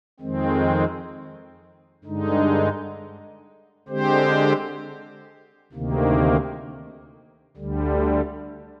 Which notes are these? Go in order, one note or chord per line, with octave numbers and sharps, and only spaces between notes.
F2 D#3 G#3 C4
G2 D3 G#3 D#4
D3 G#3 C4 G4 C5
D2 C3 D#3 A#3
D2 D3 G3